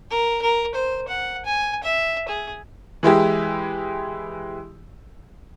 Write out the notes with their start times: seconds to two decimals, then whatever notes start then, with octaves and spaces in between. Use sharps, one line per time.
0.10 A#4
0.42 A#4
0.75 C5
1.08 F#5
1.46 G#5
1.84 E5
2.28 G#4
3.03 E3 G#3 E4 G4